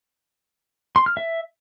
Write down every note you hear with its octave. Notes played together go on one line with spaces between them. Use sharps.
C6
F6
E5